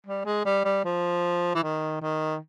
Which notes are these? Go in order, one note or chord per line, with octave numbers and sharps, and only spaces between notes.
G3
G#3
G3
G3
F3
E3
D#3
D#3